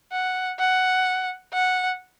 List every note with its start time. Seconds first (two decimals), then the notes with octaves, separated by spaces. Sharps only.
0.12 F#5
0.60 F#5
1.53 F#5